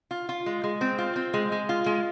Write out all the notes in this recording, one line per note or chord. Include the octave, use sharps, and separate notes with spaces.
F4
F4
G#3
G#3
C4
F4
C4
G#3
G#3
F4
G#3